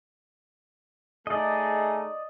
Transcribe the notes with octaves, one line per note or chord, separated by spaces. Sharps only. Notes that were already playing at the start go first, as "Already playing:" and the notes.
A3 D#4 G#4 D5 D#5